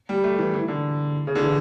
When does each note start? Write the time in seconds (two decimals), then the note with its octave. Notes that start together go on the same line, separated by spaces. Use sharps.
0.09 G3
0.24 A3
0.39 E3
0.54 E3
0.68 D3
1.27 C#3
1.35 D3
1.43 E3